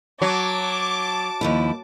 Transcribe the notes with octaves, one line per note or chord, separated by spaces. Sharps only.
F#3 A5 D6
D#2 F3 E4